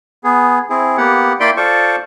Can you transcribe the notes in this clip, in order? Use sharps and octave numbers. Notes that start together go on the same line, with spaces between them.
B3 G#4
C4 E4 G#4
A#3 B3 G4 F#5
A#3 E4 D5 G5 B5 C6
F4 A4 C5 D5 C#6